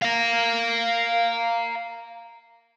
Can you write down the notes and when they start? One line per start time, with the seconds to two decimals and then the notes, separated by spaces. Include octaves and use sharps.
0.02 F5 A#5